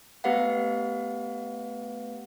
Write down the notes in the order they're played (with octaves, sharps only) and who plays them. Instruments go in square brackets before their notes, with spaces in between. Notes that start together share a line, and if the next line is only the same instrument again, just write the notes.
[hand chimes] A3 B3 G4 B4 F5 F#5